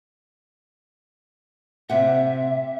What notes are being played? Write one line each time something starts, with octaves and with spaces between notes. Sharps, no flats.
C3 E5 F#5